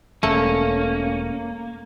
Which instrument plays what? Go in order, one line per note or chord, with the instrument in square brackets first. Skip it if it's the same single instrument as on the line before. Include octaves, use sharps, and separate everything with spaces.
[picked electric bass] E1 [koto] A3 [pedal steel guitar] A#3 [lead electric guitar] C#4